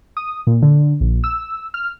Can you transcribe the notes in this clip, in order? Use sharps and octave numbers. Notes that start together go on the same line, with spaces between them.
D#6
A#2
D3
A#1
E6
F6